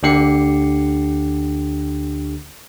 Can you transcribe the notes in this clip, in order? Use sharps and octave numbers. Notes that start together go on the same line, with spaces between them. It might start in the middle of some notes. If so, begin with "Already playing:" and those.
D2 D3 G4 C7 C#7